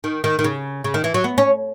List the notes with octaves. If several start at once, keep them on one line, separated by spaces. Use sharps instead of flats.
D#3
D#3
D#3
C#3
C#3
D#3
E3
F#3
B3
C#4